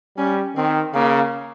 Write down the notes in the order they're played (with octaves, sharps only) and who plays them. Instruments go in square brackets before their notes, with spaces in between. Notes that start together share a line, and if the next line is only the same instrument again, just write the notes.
[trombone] G3 [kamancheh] C#4
[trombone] D#3 [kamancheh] C4
[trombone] C#3 [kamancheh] A#3